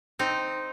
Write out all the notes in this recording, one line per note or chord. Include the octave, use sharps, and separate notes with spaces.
C4 D#4